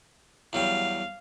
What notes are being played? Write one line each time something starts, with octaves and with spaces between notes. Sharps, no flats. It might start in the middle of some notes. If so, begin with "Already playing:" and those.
E2 F#3 G3 F5